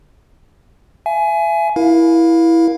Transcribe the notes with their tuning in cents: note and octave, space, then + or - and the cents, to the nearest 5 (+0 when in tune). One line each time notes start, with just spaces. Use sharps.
E5 +35 G#5 +20
E4 +0 A#4 +30 F5 +10